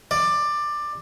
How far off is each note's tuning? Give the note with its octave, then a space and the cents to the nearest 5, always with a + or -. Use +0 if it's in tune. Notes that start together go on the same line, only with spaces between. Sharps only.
D5 +15